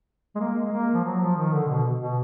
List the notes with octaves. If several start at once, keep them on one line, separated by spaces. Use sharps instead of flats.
G#3
A#3
G#3
A#3
F3
F#3
F3
D#3
D3
B2
B2